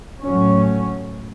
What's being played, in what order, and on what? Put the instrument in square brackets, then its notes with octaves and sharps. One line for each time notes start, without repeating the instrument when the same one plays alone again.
[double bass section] A2 F#3 C#4